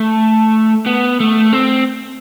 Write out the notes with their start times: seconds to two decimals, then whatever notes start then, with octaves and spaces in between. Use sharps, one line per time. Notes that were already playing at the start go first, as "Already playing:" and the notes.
Already playing: A3
0.86 B3
1.20 A3
1.53 C4